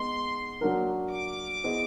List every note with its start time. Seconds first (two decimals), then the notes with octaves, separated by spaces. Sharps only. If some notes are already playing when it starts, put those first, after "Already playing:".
Already playing: G#3 B3 D#4 C6
0.61 F#3 A#3 D4 F#4 A#4
1.12 D6
1.64 B3 E4 G#4 C5 D#5